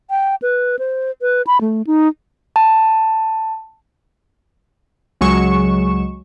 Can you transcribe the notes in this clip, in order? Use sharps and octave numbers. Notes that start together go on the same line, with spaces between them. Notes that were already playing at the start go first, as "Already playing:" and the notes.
G5
B4
C5
B4
B5
A3
D#4
A5
C#2 F#3 G#3 C#6 E7